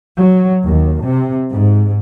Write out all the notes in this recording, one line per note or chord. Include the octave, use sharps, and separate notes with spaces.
F#3
D#2
C3
G#2